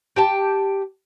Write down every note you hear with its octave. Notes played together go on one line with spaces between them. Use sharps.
G4 G5 A5